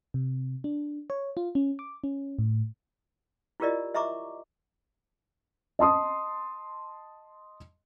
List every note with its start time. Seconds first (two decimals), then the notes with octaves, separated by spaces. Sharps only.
0.14 C3
0.64 D4
1.10 C#5
1.37 F4
1.55 C#4
1.79 D6
2.04 C#4
2.39 A2
3.60 E4 F4 G4 A#4 D5 D#5
3.94 D#5 E5 A#5 C#6 D6
5.79 D#5 A5 C6 D#6